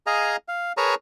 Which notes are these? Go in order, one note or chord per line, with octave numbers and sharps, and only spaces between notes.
G#4 D#5 F5 G#5 A#5
F5
G#4 A#4 B4 C#5 A5 A#5